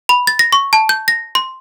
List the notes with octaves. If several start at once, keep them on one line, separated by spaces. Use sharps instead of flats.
B5
A6
A#6
C#6
A5
G6
A#6
C6